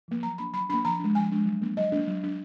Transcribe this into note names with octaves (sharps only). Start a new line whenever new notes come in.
F3 A#3
F#3 A#5
A#3 D4 B5
F#3 B5
A#3 D4 B5
F3 A#5
G#3 D4
F3 G#5
G#3 D4
F#3
A#3 D4
F#3 D#5
A#3 D4
F#3
D4